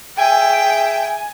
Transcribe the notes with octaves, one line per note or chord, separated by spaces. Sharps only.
G#4 E5 G5 G#5